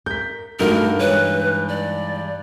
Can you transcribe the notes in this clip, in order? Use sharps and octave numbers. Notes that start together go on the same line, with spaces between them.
A#4 G6 B6
G2 A3 D#4 F#4 A4 A#4 F7
E3 G#3 B4 C#5
D5